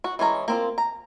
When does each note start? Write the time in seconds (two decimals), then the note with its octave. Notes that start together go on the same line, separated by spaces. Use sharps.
0.04 F#4
0.19 E3 G#3 C#4 A#5
0.48 A#3 C4 F4
0.78 A#5